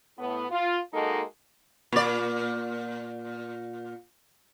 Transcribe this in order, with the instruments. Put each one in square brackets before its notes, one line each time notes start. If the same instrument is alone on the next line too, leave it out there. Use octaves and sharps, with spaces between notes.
[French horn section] A2 B3
F4
G#3 A#3 D#4 F#4 A4
[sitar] A#2 D5